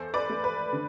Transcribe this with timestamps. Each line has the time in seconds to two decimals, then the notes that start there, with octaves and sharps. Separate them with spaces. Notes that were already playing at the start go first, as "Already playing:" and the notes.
Already playing: E2 A4 C5
0.14 B4 D5
0.30 A3
0.44 B4
0.73 D3